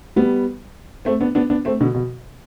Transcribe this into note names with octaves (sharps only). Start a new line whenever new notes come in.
G3 B3
A3 C4
B3 D4
B3 D4
B3 D4
A3 C4
B2 D3
B2